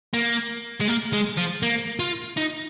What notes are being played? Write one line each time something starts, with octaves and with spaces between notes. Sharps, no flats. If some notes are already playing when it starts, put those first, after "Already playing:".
A#3
G#3
A#3
G#3
F3
A#3
F4
D#4